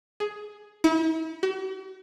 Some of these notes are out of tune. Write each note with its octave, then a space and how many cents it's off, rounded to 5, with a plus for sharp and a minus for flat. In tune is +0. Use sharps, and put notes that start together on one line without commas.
G#4 +10
E4 -40
F#4 +45